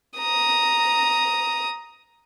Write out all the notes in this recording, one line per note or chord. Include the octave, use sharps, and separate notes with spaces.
A#5 D#6